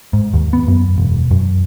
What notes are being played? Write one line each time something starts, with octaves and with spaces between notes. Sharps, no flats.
G#2
D#2
B3
F#2
E1
F#2